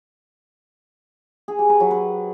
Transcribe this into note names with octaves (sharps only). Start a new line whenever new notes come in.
G#4
G4
B4
F#3
B4